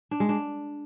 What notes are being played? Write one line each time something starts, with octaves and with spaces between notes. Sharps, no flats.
D4
G#3
D4